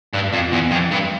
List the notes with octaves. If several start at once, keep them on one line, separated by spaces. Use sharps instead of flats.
G2
F2
E2
F2
G2